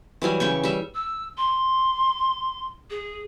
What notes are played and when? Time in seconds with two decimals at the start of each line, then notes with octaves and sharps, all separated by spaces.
0.22 E3 F#3 G3 G#5
0.40 C#3 G5 C#6
0.63 G3 E5
0.94 E6
1.37 C6
2.90 G#4